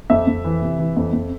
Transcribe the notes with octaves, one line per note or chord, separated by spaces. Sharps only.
F2 E5
F2
E3
C3
E3
F2
F2